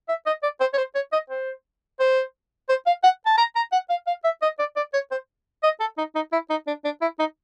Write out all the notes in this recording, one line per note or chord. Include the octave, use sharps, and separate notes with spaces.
E5
D#5
D5
C5
C#5
C5
C#5
D#5
C5
C5
C5
F5
F#5
A5
A#5
A#5
F#5
F5
F5
E5
D#5
D5
D5
C#5
C5
D#5
A4
D#4
D#4
E4
D#4
D4
D4
E4
D#4